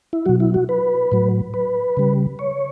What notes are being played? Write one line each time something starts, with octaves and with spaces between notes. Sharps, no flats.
E4
B2 F#3 F#4
E4
F#4
B4
A2 F#3
B4
C#3 G3
C#5